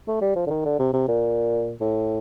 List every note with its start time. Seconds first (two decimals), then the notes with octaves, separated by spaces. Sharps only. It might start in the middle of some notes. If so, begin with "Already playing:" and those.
0.08 A3
0.21 G3
0.36 F3
0.46 D3
0.50 D#3
0.65 D3
0.79 C3
0.93 C3
1.08 A#2
1.81 A2